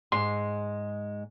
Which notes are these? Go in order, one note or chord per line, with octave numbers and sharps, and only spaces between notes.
G#2 G#3 C6